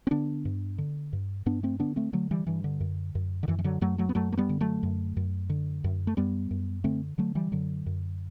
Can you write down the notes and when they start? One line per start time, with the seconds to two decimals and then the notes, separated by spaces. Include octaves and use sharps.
0.07 C4
0.11 D3 B3 D4
0.45 G2
0.78 D3
1.13 G2
1.46 G2 B3 D4
1.63 A3 C4
1.79 D3 B3 D4
1.96 A3 C4
2.13 D3 F#3 A3
2.31 E3 G3
2.47 G2 E3
2.64 D3
2.80 F#2
3.15 F#2
3.43 D3
3.48 F#2 E3
3.59 E3
3.64 D3 F#3
3.81 F#2 F#3 A3
3.98 F#3 A3
4.09 B3
4.15 F#2 F#3 A3
4.32 A3
4.37 G3 B3
4.49 D3
4.61 F#3 A3
4.83 F#2
5.17 F#2
5.50 D3
5.84 F#2
6.07 A3
6.17 F#2 G3 B3
6.51 F#2
6.84 D3 A3 C4
7.18 D3 F#3 A3
7.35 E3 G3
7.52 F#2 D3 F#3
7.86 F#2